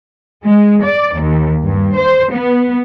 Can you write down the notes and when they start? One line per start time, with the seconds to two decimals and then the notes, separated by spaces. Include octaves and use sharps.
0.45 G#3
0.84 D5
1.21 D#2
1.65 G2
1.97 C5
2.33 B3